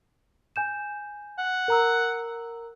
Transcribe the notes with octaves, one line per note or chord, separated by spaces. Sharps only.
G#5 G6 E7
F#5
A#4 A#5 E6